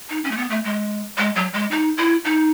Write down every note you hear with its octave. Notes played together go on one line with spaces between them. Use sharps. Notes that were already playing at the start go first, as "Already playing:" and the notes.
D#4
C#4
A3
B3
A3
G#3
G#3
F#3
G#3
D#4
E4
D#4